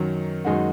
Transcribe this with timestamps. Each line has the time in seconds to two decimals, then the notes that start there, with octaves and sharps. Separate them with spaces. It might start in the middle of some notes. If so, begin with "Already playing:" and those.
Already playing: F#2 D#3 F#3
0.45 F#2 D#3 G#3 D#4 F#4